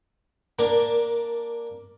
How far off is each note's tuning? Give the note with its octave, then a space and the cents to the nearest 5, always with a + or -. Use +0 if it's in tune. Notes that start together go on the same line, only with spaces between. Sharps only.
A#3 +0 D4 +0 A#4 +20